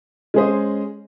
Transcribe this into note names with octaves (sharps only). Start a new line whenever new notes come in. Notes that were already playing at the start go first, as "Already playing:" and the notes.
G#3 C#4 G#4 C5 D#5